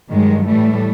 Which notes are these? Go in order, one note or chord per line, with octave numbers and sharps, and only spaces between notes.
G2 D#3 F#3 G#3
A2 E3 G3 A3